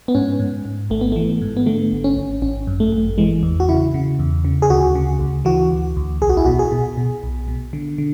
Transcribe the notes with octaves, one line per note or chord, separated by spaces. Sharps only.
B3
G#2 C#4
G#2
G#2
G#1 A3
B3
E3 A3
G#2
B3
D3 A3
G#1
C#4
G#1
G#1 C#4
F#2
A3
G#1
E3 G#3
E2
F#4
C#3 E4
C#3
E2
C#3
G#4
D2 F#4
C#3
D2
E3 F#4
D2
D2
B1 G#4
F#4
E4
B2 F#4
G#4
B2
B2
B1
B2
D3
D3